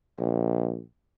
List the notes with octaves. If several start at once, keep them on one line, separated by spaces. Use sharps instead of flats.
A#1